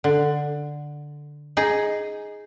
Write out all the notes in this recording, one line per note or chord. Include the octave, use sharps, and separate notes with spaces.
D3
D#4 G#4